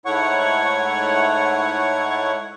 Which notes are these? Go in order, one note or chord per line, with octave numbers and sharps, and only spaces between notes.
G#2 A3 E4 C#5 F#5 C#6